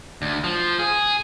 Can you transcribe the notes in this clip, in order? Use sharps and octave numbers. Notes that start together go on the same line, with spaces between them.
D2
F3
G#4